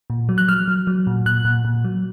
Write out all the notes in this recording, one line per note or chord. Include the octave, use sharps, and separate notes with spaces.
A#2
F#3
F#6
F#3 F6
F#3
F#3
A#2
A#2 F#6
A#2
A#2
F#3